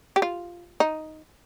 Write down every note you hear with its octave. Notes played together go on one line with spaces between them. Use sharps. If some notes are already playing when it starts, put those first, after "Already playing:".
G4
F4
D#4